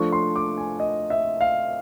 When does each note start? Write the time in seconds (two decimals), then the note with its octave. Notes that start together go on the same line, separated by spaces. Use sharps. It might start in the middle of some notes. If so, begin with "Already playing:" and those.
Already playing: F3 A3 D4 C#6
0.12 C6
0.36 D6
0.58 G#5
0.80 D#5
1.10 E5
1.41 F5